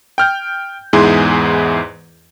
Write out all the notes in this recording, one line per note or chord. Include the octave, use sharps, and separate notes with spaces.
G5 F6 G6
E2 G#2 E4 G#4 C6